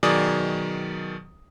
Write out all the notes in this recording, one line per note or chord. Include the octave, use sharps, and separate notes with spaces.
B2 D#3 F#3 G#4 D5 D#6